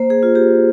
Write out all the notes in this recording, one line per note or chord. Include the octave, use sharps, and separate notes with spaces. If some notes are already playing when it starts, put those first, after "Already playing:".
Already playing: A#3 C5
G#4
F4
G4